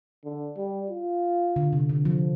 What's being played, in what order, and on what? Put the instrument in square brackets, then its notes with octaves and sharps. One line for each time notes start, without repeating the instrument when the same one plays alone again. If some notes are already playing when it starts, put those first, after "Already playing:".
[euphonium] D3
G3
F4
[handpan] D3
C3
D3
F3